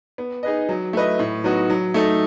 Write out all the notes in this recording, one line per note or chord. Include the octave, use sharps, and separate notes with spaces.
B3
D#4 G#4 B4 D#5
F#3
A3 E4 B4 D#5
A2
F#3 B3 D#4 F#4
F#3
A3 D#4 A4